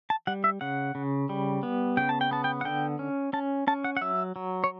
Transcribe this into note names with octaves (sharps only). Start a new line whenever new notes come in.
A5
G3 F#5
E5
C#3 F#5
C#3
G3
B3
C#3 G5
A5
G5
B3 A5
G5
F#5
D3 G5
C#4
C#4 A5
C#4 A5
F#5
F#5
F#3 E5
F#3
C#5